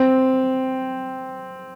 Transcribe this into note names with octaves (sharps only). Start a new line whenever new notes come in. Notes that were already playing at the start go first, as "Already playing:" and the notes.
Already playing: C4